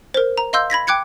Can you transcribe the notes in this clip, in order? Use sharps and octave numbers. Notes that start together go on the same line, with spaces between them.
A#4 C5
A#5
D#5 F5 C6 E6 G6
B5 G#6 A#6 B6
G5 D6 F#6 G#6 C#7